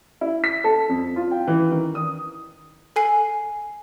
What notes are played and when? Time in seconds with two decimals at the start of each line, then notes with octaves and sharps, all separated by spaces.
0.21 E4
0.44 B6
0.64 A4
0.89 F2
1.16 F4
1.31 G5
1.47 E3
1.72 D#3
1.95 D#6
2.96 A4 G#5 C7